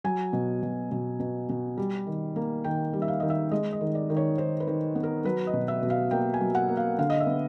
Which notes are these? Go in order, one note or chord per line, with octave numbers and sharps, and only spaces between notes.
F#3 G#5
B2
B2
B2
B2
B2
G3
D#3
A#3
D#3 G5
G3
E5
F5
D#3 D#5
E5
G#3 D#5
D#5
D#3
D5
D#3
C#5
D#3 C5
B4
D#3
B3
A#4
F#3 B4
D#5
B2
E5
B2
F5
A#3 G5
G#5
F#3
F#5
A#3
F5
D3 F5
D#5
E5
B3